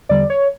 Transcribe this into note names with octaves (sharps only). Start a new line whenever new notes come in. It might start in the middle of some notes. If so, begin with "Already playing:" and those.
E2 D3 G3 D5
C#5